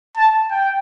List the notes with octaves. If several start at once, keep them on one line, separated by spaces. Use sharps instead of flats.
A5
G5